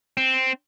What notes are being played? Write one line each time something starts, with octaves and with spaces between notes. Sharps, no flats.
C4